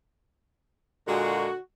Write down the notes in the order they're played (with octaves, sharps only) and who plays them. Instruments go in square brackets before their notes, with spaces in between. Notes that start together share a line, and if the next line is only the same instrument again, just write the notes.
[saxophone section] A#2 G#3 [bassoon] D3 [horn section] F#4